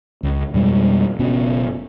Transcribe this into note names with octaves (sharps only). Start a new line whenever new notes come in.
C#2
F2 B2 G3 G#3
F#1 B2 C#4